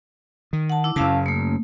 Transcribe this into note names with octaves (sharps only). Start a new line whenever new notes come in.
D#3
F#5 A5
E4 D6 E6
F#2 C#3 C#4 F5 A5
A3 A#3